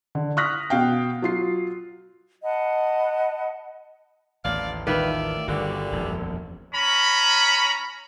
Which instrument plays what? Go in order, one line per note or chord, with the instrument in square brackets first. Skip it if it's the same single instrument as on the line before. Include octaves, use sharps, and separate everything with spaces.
[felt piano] D3
C#6 D#6 F6 F#6 A#6 B6
B2 F5 G5
F#3 F4 C7
[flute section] D#5 F#5 A5 B5
[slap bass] A1 D#2 [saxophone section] D5 F5
[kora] D#3 B4 [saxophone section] F4 D5 E5
[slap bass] G1 [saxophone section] A#2 D3 G3 [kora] F#4
[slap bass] E1 A#1 F#2
[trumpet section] C#4 A#5 B5